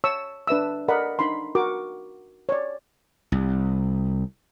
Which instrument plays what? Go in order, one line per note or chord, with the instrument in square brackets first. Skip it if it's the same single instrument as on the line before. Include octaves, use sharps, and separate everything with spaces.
[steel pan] C#5 A5 C#6 E6
D4 B4 E5 E6
A4 A#4 D5 D#5 F#5 B5
D4 D#4 B5 C6
F#4 A#4 D6
C#5 D5
[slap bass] C2